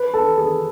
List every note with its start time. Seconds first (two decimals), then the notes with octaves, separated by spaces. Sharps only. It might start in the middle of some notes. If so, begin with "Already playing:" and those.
Already playing: B4
0.14 A4
0.37 G#4